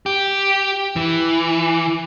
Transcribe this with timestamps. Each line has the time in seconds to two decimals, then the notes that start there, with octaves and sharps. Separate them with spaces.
0.06 G4
0.96 E3